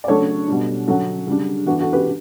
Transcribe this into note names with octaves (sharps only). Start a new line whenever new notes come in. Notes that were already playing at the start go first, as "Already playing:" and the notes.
D5
C#3 F#3 A3 D4 A4 C#5
B2 G3 D4
D3 F#3 C#4 F#4 A4
C#3 G3 D4
E3 B3 D4 F#4
F#4 A4
G4 B4